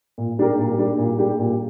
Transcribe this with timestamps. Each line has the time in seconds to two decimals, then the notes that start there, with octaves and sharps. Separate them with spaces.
0.18 A#2
0.39 G3 D4 G4 A#4
0.59 A#2
0.78 G3 D4 G4 A#4
0.98 A#2
1.19 G3 D4 G4 A#4
1.39 A#2